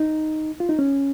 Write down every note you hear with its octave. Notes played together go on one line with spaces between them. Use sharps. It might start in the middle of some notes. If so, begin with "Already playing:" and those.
Already playing: D#4
F4
D#4
C#4